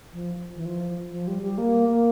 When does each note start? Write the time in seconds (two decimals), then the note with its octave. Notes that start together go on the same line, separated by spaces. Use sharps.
0.13 F3
0.56 E3
0.65 F3
1.12 F3
1.27 G3
1.42 G3
1.58 A#3
1.89 A#3